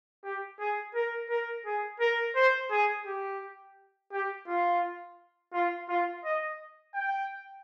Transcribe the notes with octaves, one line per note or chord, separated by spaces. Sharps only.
G4
G#4
A#4
A#4
G#4
A#4
C5
G#4
G4
G4
F4
F4
F4
D#5
G5